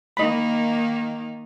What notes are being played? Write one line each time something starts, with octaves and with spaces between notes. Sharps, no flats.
D#3 A#3 D#4 D#5 B5